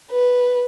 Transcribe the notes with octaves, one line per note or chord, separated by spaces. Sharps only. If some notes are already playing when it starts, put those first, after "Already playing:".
B4